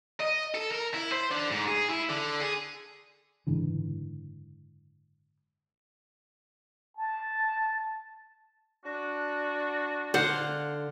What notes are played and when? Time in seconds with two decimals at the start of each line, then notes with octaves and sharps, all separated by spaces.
0.20 D#5
0.54 A4
0.71 A#4
0.94 E4
1.12 C5
1.31 D3
1.51 G#2
1.68 G#4
1.90 E4
2.09 D3
2.40 G#4
3.47 F#1 G#2 D3 E3
6.97 A5
8.84 D4 F#4
10.14 D3 C5 F5 F#5